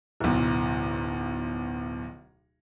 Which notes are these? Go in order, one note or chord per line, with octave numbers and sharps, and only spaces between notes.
D1 B1